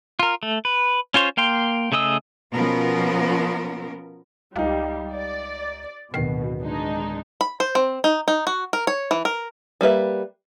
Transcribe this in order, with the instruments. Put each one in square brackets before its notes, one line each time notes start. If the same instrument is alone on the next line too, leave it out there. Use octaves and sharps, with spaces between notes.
[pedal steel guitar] F4 A#4
A3
B4
C#4 F4 C5 C#5
A#3 F5 G5 C6
C#3 A3 G#4 D#5 E6
[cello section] B2 F3 B3 C#4 A#4
[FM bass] C#2 [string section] G3 [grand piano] D#4 G4 F5
[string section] D5
[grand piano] D1 C7 [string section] B2 [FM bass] D#3
[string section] G#3 D4 D#4
[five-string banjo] B5
C5
C4
D#4
D#4
F#4
A#4
C#5
E3
A#4
G3 A#3 B4 E5